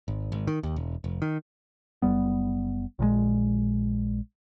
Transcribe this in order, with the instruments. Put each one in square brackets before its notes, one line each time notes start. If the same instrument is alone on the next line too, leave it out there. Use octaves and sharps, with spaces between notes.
[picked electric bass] G#1
G#1
D#3
D#2
E1
F1
D#3
F#1 G3 B3
A#1 A#2 E3 G#3